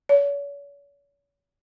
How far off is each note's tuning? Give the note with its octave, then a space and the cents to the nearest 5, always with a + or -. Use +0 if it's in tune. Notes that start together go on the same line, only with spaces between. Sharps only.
C#5 +40